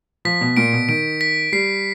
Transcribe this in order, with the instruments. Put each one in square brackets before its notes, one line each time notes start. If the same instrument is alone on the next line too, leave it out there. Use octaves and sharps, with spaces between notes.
[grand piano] F3 [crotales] B6
[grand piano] B2
[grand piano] A#2 [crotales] D7
[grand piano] B2
[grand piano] D#3 [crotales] D7
[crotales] B6
[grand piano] G3 [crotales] C7